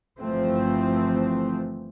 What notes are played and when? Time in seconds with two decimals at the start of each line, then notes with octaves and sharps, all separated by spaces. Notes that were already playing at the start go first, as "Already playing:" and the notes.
0.21 G1 E3 F3 A3 C4